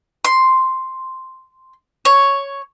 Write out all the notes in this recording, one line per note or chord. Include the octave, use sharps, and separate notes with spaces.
C6
C#5